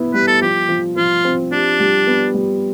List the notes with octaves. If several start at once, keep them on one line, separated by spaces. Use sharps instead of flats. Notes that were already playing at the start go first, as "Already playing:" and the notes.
Already playing: E3 B3 E4
G3 B4
A4
F3 G4
F3
F3 F4
C4
D4 G4
G3
B3
G3